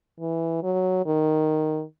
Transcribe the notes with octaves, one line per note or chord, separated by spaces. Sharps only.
E3
F#3
D#3